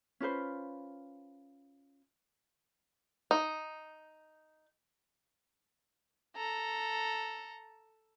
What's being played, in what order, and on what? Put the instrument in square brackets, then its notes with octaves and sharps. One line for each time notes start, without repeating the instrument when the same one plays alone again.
[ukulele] C#4 F4 B4 C5
[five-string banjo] D#4
[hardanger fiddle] A4 A#5